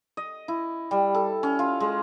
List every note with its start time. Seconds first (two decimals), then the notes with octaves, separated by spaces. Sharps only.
0.17 D#5
0.48 E4
0.91 G3
1.15 A4
1.43 C#4
1.59 F4
1.80 G#3